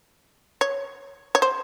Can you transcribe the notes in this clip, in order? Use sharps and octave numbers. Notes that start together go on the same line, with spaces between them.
C#5
C#5
C5